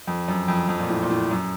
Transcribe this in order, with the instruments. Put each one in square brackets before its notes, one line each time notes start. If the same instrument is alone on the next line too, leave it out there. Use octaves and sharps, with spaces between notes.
[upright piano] F2
F#2
F2
F2
A#2
A2
A#2
A2
F#2